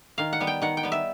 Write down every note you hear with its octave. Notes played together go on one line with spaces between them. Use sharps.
D#3 F5
F#5
G3 B3
G5
D#3 F#5
G5
G3 B3
E5